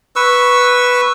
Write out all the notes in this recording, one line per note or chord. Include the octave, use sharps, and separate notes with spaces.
B4 C#6 E6